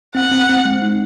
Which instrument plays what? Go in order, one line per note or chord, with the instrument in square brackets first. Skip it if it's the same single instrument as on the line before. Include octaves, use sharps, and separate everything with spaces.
[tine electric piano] C4 [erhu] F#5
[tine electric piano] C4
C4
G#3
D#4